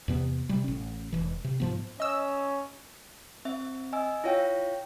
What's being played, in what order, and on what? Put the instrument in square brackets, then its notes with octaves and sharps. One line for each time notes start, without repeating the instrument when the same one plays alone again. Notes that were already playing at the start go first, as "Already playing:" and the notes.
[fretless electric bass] E2 C3 B3
C3 G3
A1 C#4
E1 E3
C3
G#2 F3 B3
[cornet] C#4 [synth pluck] D#5 E6
[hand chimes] C4 E5
D#5 G#5 E6
E4 F4 C#5 F5 G5